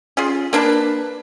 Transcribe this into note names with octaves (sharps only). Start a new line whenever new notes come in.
C#4 F4 G#4
A#3 D4 B4 A5